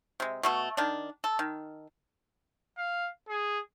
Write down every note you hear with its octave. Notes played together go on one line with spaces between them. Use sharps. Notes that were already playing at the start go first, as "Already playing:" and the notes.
C3 G#3
B2 A3 F#4
D#3 D4
A4
D#3
F5
G#4